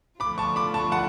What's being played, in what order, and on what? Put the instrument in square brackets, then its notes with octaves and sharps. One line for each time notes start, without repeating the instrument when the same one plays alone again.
[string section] D3 F3 A3 F4 [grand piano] B5 D6
[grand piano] A5 C#6
B5 D6
A5 C#6
F#5 A5